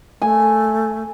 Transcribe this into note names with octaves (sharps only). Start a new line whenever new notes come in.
A3 G#5